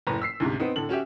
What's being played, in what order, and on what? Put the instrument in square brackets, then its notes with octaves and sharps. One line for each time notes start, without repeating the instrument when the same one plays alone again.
[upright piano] F#1 A2 B4 A#5
E6 B6 C7
D2 G#2 C3
B3 C4 D#4
A2 D3 A4 F#7
C#4 F#4 G4 E5